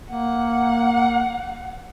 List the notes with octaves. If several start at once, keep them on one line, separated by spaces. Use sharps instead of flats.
A#3 F#5